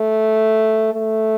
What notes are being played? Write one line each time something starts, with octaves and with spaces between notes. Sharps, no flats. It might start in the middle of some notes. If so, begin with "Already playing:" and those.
Already playing: A3
A3